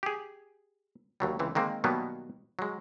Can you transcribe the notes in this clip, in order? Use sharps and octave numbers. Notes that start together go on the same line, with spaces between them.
G4 G#4
D#2 F#3 G3
C#2 E3 C4
D#3 G#3 A#3 C4
B2 D#3 F#3 G3 A#3 B3
F#3 G#3